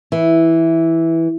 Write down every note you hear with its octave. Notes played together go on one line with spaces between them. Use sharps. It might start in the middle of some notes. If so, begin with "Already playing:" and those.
E3